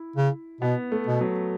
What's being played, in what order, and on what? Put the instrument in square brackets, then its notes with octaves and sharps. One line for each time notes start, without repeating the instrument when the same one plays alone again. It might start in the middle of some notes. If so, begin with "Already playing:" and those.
Already playing: [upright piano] E4
[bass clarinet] C#3
[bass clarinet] B2 [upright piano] B3
[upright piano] A3
[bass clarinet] B2
[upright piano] F#3